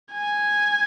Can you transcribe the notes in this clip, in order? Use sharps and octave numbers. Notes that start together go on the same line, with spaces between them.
G#5